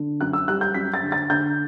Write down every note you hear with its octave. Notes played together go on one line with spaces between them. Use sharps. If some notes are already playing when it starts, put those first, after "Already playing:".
Already playing: D3
F#2 F#6
E6
G3 F#6
G6
F#2 B6
A6
D3
A6
D3 G6